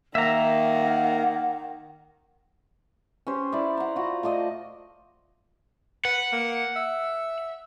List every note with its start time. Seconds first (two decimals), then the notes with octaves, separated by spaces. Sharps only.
0.15 D#3 A#3 E5 F#5 A#5
3.27 C#4 G4 C5
3.52 E4 D5
3.77 F#5 A#5
3.96 F4 F#4
4.23 A3 F4 D5 D#5
6.05 B4 F#5
6.32 A#3
6.76 E5